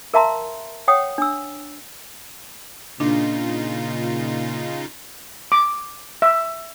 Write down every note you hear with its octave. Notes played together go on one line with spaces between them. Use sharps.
A#4 E5 F5 A5 A#5 C6
C#5 F#5 G5 D#6
D4 E6
A#2 C#3 D4 D#4 F4
D6
E5